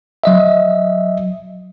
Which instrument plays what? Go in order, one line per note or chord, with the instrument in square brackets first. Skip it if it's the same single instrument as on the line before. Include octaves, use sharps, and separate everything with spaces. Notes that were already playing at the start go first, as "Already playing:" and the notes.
[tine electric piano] F#3 D#5 E5